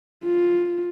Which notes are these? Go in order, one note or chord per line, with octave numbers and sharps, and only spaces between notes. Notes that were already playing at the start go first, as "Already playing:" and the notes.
F4